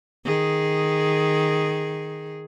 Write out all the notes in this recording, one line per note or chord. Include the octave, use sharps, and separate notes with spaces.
D#3 G#4